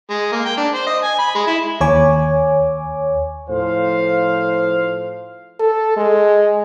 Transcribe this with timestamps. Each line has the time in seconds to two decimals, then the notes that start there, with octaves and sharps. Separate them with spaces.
0.10 G#3
0.32 A#3
0.45 G5
0.57 D4
0.74 C5
0.87 D#5
1.04 G#5
1.19 B5
1.35 G#3
1.47 E4
1.81 D#2 C#5 G#5 D6
3.49 A2 F3 C5 F5
5.60 A4
5.97 G#3